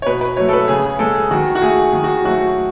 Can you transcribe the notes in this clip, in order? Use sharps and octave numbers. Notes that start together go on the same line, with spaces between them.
C#5
B2 B4
B4
F#3 A3 C#5
A4
B4
C#3 G#4
G#4
G#3 B3 A4
G#4
D#3 F#4
F#4
A3 G#4
D#3 G#4
F#4
F#3 A3 F#4